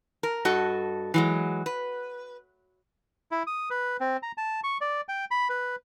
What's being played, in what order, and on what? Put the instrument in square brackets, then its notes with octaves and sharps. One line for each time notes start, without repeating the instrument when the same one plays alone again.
[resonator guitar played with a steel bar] A#4
G2 F#4 A4 D#5
E3 F#3 G#3
B4
[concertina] E4
D#6
B4
C4
A#5
A5
C#6
D5
G5
B5
B4